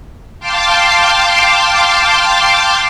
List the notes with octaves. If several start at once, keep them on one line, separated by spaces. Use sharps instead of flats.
F5 G5 A5 C6 D6